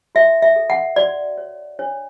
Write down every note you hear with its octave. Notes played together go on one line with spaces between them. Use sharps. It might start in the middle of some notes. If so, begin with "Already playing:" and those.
F#4 E5
E5
A4
F#5
F#4 D5
C#5
D4 C#5